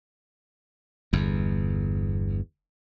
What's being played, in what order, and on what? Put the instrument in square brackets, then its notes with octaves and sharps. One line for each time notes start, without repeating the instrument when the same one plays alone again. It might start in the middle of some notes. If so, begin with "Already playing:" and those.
[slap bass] G1 E2